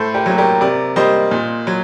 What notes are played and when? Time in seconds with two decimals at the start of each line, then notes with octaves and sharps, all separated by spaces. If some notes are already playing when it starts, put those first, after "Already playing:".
Already playing: A2 A4 C5
0.14 G4 A#4
0.26 F#3 A#3
0.38 G4 A#4
0.61 C3 A#4 D5
0.96 G3 A#3 C5 D#5
1.31 A#2
1.67 F#3